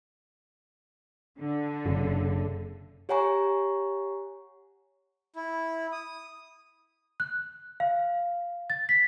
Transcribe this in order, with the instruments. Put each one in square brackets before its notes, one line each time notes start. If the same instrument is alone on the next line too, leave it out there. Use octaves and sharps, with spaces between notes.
[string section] D3
[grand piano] F#1 [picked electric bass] F#2 C3
[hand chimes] G4 C#5 F#5 G#5 A#5 C#6
[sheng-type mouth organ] E4
D#6
[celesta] F#6
F5
A6
B6